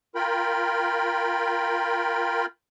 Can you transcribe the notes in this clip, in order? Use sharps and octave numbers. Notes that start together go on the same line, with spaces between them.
F4 A#4 G5 B5